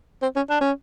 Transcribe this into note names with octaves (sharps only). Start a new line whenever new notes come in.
C4
C#4
D4
C#4